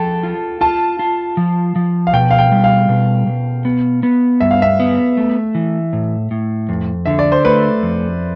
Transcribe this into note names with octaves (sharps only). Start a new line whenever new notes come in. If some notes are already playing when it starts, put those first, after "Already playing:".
Already playing: F3 A4 G5 A5
F4
F4 A5
F4
F3
F3
F5
B2 G5
F5
G5
G3
F5
B2
B2
B3
B3
G2 E5
F5
E5
B3
A3
E3
A2
A2
F2
D3 E5
D5
C5
A3 B4
F2